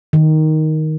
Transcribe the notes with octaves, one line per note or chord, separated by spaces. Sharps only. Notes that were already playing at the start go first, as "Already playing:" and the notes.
D#3